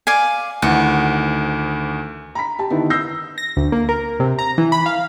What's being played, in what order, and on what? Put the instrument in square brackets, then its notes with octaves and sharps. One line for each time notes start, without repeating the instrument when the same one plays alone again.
[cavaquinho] D5 F5 G#5
[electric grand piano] D2 D#3 E3 [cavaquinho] F#5
[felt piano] A#5 B5 B6
G4 A5
D3 D#3 B3 D#4 E4
E6 G6 A#6 C7
[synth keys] A#6
D2
A#3
A#4
C3
A#5
E3
B5
F5